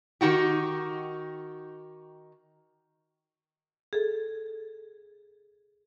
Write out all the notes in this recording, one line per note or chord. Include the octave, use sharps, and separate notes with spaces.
D#3 D#4 F#4 G4
G#4 A4